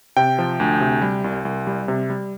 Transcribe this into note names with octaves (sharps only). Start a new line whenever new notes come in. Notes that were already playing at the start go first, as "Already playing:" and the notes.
C3 G5
F3
D2
C3
G3
C2
C2
G3
C3
G3